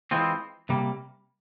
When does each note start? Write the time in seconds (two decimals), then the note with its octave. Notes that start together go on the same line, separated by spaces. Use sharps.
0.11 E3 G#3 C4 F4
0.69 C3 G3 A#3